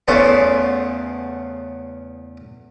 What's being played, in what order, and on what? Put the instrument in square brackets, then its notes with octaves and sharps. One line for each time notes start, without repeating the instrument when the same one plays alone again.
[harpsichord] E2 C#3 A3 B3 C5 A5